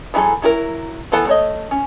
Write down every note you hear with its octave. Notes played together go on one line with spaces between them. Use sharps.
E3 F#3 E4 G#4 A4
F#3 E4 G#4 A#4
E3 B3 A4 F#5
A3 C#5 D#5
C#4